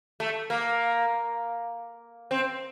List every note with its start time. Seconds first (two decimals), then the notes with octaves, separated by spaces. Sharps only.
0.20 A3
0.50 A#3
2.31 C4